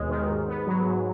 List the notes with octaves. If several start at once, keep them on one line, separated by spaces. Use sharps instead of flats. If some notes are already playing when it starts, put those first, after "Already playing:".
Already playing: D#2 B2 G#3
D#3
G#2
B3
F#3
G#2